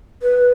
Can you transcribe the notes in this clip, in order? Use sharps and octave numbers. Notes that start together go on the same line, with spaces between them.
B4